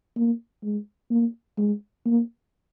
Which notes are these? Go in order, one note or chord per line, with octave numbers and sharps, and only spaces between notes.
A#3
G#3
A#3
G#3
A#3